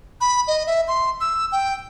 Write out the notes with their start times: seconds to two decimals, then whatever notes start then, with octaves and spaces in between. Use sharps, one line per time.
0.21 B5
0.48 D#5
0.67 E5
0.88 C6
1.21 E6
1.52 G5